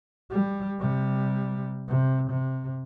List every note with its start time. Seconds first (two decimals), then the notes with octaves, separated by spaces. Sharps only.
0.30 G3
0.79 C3 G3
1.88 C3
2.30 C3